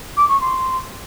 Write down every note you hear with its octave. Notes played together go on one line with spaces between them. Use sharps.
D6
C#6
C6